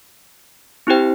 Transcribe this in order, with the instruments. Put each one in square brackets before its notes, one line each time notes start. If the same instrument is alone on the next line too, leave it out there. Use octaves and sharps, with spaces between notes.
[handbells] C4 E4 G4 C5 G5